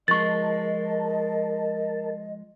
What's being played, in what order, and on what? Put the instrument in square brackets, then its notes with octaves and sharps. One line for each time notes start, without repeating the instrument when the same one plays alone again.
[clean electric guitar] F3 G#3 [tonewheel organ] A#4 A5 [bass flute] D#5 [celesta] C#6 A6